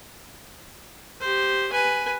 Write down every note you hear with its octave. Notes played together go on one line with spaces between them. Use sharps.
G4 C5
B4 G#5